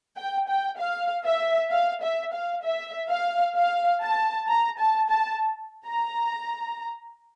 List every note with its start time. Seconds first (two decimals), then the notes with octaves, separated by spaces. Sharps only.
0.16 G5
0.48 G5
0.78 F5
1.25 E5
1.70 F5
2.01 E5
2.32 F5
2.63 E5
3.09 F5
3.55 F5
4.01 A5
4.47 A#5
4.78 A5
5.08 A5
5.86 A#5